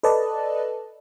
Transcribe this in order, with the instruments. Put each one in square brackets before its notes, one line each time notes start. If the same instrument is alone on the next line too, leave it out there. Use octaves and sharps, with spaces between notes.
[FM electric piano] A4 B4 D5 D#5 A5